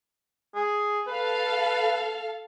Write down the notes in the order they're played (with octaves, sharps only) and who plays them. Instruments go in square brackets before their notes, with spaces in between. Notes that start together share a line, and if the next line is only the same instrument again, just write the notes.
[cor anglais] G#4
[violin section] A4 F5 [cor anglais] B4